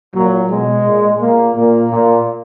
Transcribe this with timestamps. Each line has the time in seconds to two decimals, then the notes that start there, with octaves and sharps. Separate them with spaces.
0.15 A#2 F#3
0.50 B2 G#3
0.85 A#2
1.20 A#2 A#3
1.55 A#2 A#3
1.91 A#2